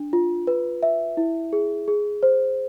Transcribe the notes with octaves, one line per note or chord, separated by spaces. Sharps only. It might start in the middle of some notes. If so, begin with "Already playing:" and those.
Already playing: D4
F4
B4
E5
E4
G#4
G#4
C5